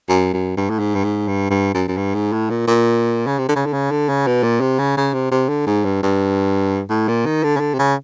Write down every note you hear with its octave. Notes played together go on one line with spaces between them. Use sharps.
F#2
F#2
G2
A2
G#2
G2
G#2
G2
G2
F#2
F#2
G2
G#2
A2
A#2
A#2
C#3
C3
D3
C#3
D3
C#3
D3
C#3
B2
A#2
C3
C#3
C#3
C3
C3
D3
G#2
G2
G2
A2
A#2
D#3
D3
C#3
D3
C3
C#3